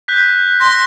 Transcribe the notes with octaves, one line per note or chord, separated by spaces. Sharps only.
F#6 G6 B6
C6 A#6